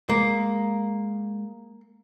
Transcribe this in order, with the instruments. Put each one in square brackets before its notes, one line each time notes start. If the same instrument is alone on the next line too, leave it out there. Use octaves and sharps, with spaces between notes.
[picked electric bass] G#3 [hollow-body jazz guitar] A#3